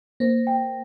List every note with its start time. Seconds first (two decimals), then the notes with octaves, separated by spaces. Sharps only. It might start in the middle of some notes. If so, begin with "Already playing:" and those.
0.20 A#3 C5
0.47 G5